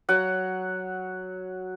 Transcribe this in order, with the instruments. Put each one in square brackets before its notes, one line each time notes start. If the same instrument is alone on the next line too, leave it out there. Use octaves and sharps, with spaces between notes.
[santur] F#3 F#5